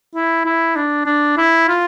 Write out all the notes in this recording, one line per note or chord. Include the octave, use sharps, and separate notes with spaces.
E4
E4
D4
D4
E4
F4